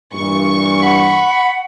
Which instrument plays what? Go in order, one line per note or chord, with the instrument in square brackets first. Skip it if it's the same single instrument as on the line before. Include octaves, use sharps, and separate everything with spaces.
[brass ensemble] G2 A#2 E3 [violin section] C#6
[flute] F#5 [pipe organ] B5